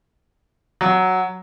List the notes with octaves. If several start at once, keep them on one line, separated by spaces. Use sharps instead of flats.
F#3